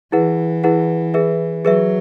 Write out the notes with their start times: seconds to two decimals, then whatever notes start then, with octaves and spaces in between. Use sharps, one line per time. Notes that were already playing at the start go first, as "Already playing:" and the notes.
0.12 E3 E4 G#4 B4 F#5
0.64 E4 G#4 B4 F#5
1.14 G#4 B4 E5
1.65 F#3 G#4 B4 E5